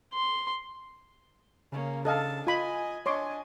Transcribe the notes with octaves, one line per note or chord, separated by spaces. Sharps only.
C6
C#3 A#3 C#4
D4 A4 D#5 F5 A5
F4 D#5 G#5 B5
D4 C#5 D#5 C6 D6